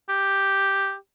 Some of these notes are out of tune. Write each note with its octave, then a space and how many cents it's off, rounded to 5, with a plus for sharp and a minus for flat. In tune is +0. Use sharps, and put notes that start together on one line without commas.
G4 +0